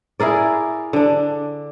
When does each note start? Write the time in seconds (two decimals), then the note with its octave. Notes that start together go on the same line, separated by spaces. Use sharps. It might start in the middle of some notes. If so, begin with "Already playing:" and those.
0.20 E4 G#4 A#4 D5
0.93 D3 D4